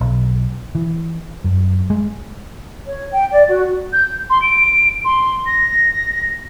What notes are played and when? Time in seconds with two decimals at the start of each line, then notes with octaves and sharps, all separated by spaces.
0.01 B1
0.75 E3
1.44 F#2
1.90 G#3
2.87 C#5
3.12 G5
3.32 D5
3.47 F#4
3.93 G6
4.30 C6
4.42 D7
5.05 C6
5.46 A#6